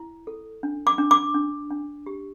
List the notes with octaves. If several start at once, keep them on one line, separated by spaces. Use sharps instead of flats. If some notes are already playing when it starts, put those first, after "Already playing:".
Already playing: E4
A4
D4
D6
D4
D6
D4
D4
G4